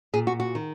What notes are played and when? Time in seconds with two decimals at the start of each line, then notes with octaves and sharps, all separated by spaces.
0.13 A#2 G#4
0.27 F#4
0.40 F#4
0.55 D#3